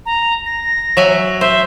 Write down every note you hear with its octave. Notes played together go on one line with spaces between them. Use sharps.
A#5
A#6
F#3 E5 G#5
C5 E5